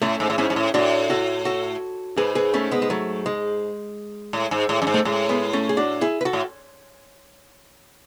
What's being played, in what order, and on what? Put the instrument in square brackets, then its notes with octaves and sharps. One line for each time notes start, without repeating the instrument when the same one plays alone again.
[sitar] A2 [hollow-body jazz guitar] A3 C#4
[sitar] G#2
A2
[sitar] G#2 [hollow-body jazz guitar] C#4 E4
[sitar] G#2
A2
[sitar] A2 [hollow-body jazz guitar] D4 F#4
[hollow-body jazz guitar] F#4 A4
F#4 A4
[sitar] G#2 [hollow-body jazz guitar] G#4 B4
[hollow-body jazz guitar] G#4 B4
A3 C#4
G#3 B3
G#3
F#3 A3
G#3
[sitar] A2
G#2
A2
F#2
G#2
[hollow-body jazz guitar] A3
[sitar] A2 [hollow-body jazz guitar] G#3
[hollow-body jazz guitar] G#3 B3
A3 C#4
G#4
D4 F#4
E4 G#4
B4
F#4 A4
[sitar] A2